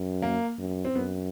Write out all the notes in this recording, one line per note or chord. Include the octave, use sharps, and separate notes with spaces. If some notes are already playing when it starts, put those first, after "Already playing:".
Already playing: F#2
A#3
F#2
C4
F#2 B3